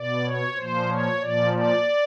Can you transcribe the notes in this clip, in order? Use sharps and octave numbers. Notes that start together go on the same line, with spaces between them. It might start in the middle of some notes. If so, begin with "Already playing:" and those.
Already playing: B2 D5
C#5
A#2 F3 C5
C#5
A#2 F3 D5
D5